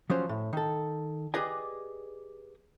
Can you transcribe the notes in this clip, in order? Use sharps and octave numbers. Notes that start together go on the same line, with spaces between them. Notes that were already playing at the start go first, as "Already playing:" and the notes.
F3 F#3 C#4 C5
A2
D#3 A4
G4 G#4 B4 D5 D#5 G#5